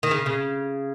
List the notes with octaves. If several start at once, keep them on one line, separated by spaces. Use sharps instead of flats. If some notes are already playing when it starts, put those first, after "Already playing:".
D#3
C#3
C#3